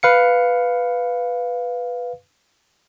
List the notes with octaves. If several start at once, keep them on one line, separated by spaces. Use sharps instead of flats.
B4 F5 C#7